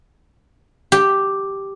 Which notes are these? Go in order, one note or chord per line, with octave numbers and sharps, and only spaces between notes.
G4